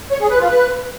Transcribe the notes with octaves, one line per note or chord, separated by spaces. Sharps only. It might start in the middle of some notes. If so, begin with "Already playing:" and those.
C#5
G#4
B4
F4
B4